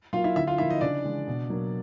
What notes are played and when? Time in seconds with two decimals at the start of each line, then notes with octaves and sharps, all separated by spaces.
0.13 F#3 F4 F5
0.16 A#3
0.24 E4 E5
0.36 D3 E4 E5
0.47 F4 F5
0.58 F3 A#3 E4 E5
0.70 D#4 D#5
0.81 C#3 D4 D5
1.04 E3 G#3
1.28 B2
1.50 F#3 A#3